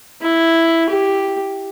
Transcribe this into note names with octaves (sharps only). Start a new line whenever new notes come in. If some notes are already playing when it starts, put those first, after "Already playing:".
E4
G4